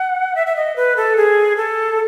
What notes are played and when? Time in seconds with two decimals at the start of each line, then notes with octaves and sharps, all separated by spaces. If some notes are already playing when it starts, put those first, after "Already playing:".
Already playing: F#5
0.35 E5
0.47 E5
0.56 D#5
0.76 B4
0.96 A4
1.17 G#4
1.57 A4